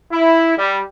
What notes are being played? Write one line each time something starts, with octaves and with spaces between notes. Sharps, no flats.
E4
G3